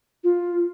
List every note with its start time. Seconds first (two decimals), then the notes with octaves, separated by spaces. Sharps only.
0.24 F4